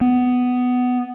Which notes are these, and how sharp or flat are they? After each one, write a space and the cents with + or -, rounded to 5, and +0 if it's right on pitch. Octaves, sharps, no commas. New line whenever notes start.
B3 +10